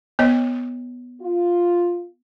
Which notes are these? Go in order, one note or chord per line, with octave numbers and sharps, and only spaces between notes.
B3 C#5 D#5
F4